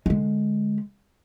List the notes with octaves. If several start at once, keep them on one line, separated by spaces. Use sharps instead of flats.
D3 G#3